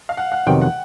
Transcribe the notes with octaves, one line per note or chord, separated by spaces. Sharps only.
F5
F#5
F#5
F2 C3 D#3 F#3 B3 G5
F#5